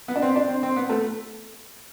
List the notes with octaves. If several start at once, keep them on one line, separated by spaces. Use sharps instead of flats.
B3
D4
C4
D4
C4
C4
B3
A3